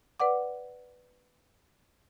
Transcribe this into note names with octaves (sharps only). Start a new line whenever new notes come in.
B4 D5 F#5 D6